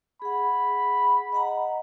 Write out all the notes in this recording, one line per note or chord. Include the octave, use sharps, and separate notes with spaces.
G#4 F#5 B5
D#5 F#5 A#5